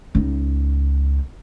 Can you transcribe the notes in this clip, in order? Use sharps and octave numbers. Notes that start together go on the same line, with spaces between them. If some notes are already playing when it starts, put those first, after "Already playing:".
C#2 D#4